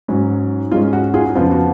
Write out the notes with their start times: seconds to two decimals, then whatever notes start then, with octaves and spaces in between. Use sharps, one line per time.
0.08 G#2 F#3 C#4
0.72 G#2 G#3 C#4 F4
0.93 F#4
1.14 F4 G#4
1.26 F#4
1.35 F2 C#3 F3 B3 F4
1.51 F#4